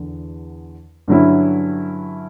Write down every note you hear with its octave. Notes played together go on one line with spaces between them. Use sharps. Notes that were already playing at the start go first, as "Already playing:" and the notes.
Already playing: E2 D3
G2 D3 F#3 C#4 E4